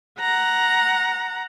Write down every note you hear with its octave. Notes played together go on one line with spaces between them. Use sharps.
F#5 A#5